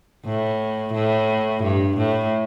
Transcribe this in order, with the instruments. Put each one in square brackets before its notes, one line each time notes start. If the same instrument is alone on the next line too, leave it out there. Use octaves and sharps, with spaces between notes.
[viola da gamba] A2
A2
G2
A2